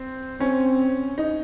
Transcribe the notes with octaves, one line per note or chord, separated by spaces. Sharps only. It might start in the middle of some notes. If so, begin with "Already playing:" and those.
Already playing: C4
C4 C#4
D#4